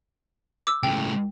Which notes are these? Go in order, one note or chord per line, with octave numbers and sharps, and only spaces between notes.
D6 E6
C#2 A2 G5